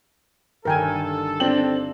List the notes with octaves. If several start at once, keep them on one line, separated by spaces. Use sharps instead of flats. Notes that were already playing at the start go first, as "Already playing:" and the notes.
G1 D#3 A4 A#4 G5 G#5
C4 D4 G5 F#7